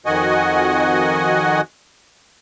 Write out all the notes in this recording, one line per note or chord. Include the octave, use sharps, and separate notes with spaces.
F2 D#3 F#4 D#5 F#5 G#5